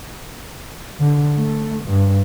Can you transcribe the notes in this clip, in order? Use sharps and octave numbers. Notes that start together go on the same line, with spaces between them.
D3
A3
G2